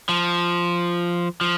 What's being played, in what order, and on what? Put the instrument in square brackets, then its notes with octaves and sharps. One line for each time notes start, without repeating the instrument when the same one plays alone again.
[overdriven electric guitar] F3
F3